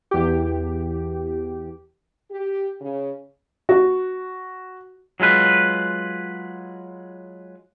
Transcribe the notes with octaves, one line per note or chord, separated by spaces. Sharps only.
E2 G4
G4
C#3
F#4
F#3 G#3 F4 B4